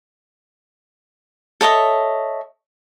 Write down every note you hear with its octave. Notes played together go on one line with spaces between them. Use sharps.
A4 C#5 D#5 E5